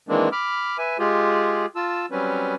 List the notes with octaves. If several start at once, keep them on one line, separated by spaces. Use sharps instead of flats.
D#3 E3 G#3 A#3 C4 D4
B5 D6 F6
B4 E5 G#5
G#3 F4 G4 G#4
F4 A5 E6
F#3 G3 C4 C#4 B4